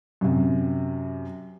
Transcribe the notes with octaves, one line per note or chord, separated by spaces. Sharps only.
F#2 C3